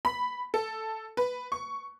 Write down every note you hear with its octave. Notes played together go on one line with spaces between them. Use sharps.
B5
A4
B4
C#6